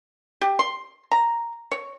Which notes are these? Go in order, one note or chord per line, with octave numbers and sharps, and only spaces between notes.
G4
C6
A#5
C#5